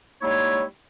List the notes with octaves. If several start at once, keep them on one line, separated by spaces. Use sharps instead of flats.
G3 G#3 A#3 D#4 E4 C#5